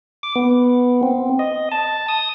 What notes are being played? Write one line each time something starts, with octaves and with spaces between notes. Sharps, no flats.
D6
B3
C4
D#5
A5
D#6